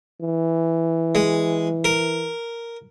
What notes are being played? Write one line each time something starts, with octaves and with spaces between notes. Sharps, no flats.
E3
G#3
A#4